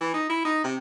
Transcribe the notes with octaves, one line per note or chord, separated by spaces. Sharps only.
E3
D#4
E4
D#4
C3